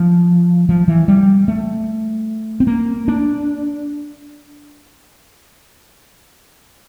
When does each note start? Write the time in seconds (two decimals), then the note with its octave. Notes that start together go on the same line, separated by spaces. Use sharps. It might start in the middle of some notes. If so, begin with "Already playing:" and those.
Already playing: F3
0.69 F3
0.88 E3
1.08 G3
1.48 A3
2.60 C4
2.67 A#3
3.08 D4